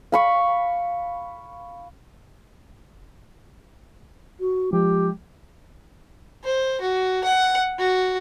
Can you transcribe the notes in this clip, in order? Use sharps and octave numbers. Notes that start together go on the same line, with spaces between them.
F5 B5 C#6
F#4
F3 G#3 G4
C5
F#4
F#5
F#4